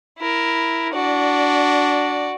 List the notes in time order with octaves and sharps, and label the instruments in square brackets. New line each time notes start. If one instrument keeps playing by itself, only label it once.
[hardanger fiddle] E4 A#4
[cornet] D4 [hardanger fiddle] F#4 D5